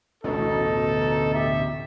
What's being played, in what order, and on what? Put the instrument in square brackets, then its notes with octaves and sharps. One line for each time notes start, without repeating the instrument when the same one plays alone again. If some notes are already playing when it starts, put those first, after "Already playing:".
[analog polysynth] A1 D2 B2 [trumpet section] D#4 A4
[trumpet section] G4 E5